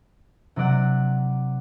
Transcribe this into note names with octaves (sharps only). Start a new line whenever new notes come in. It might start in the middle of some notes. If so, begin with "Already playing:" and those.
C3 F#3 D5 F#5